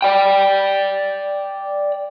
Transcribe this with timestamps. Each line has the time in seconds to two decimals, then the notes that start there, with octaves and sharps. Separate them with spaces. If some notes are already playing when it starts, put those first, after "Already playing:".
0.02 D5 G5